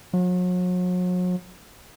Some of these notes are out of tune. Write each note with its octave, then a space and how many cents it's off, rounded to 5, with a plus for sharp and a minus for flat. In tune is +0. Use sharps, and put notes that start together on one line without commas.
F#3 -40